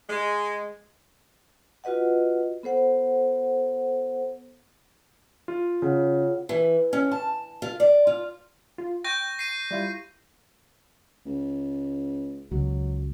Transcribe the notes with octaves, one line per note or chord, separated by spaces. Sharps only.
G#3
F4 F#4 B4 D#5 F#5
B3 A4 C5 F#5
F4
C#3 F4 C#5 F#5
E3
C#4
A5
F4
D5
F4
F4
G5 C#6 G6 A#6
C7 D#7
G3 E4 F4
C#2
C#2 F#3